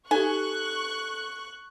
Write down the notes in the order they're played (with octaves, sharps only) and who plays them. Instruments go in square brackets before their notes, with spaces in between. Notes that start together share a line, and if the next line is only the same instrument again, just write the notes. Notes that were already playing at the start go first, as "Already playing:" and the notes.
[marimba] D#4 G4 [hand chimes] A4 [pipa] G#5 [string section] C#6 F#6